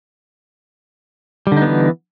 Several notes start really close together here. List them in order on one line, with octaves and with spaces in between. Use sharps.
G3 D3 D#4 B3 E3